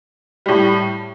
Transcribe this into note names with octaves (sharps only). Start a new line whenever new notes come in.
A2 G3